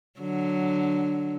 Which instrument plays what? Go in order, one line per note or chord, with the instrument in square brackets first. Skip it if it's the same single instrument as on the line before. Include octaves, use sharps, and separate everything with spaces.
[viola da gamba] D3 F#3